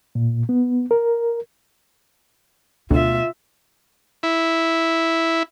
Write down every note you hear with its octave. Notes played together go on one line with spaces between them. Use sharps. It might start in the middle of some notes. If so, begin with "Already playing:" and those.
A#2
B3
A#4
D2 B2 F4 E5
E4